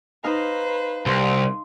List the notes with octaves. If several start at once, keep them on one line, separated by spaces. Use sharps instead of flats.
D#4 B4 C5 F5 A#5
C2 C6